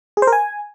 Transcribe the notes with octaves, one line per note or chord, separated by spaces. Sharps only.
G#4
C5
A#4
G#5